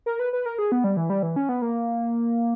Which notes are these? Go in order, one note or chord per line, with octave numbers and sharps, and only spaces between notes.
A#4
B4
B4
A#4
G#4
B3
G3
E3
G3
E3
C#4
B3
A#3